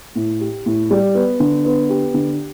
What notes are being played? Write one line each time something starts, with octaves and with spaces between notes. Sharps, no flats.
A2
G4
A2
G3
B3
D3
B3
G4
D3